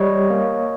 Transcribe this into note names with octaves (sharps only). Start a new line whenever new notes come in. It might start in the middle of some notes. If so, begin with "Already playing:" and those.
Already playing: G3 C#5 D#5
A#3